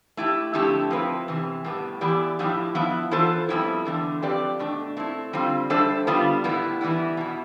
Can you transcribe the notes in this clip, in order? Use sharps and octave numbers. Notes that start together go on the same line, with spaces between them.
A3 E4 G4
F2 D3 A3 E4 G4
F3 C4 E4 B4
E2 C3 E3
A2 G3 B3
E3 B3 E4 G4 D5
A2 F3 B3 E4 G4
F3 B3 E4
E3 B3 F4 A4 C5
F2 C3 G3 B3 E4
E2 D3 A3
F3 C4 G4 B4 D5
B2 A3 D4
A3 C4 E4
D3 G3 C4 F4
G3 D4 A4 C5 E5
D3 G3 B3 D4 F4
A2 G3 B3 E4
E3 G3 B3 E4
B2 B3 E4